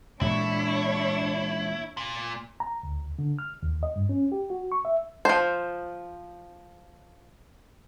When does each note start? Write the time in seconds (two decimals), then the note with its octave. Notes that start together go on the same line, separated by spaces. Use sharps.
0.21 A#2 E3 G#3 D4 E4 C#5
1.97 A#2
2.60 A#5
2.83 D2
3.19 D3
3.39 F6
3.63 D#2
3.83 D#5
3.96 G2
4.09 C#4
4.32 G4
4.50 F#4
4.72 C#6
4.85 E5
5.25 F3 C5